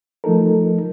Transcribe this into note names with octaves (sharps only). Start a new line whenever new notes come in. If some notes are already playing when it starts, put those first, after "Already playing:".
F3 A3 D#4 A4 A#4